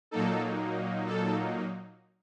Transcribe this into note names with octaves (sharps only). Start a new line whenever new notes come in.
A#2 F#3 A#3 D#4 A4
A4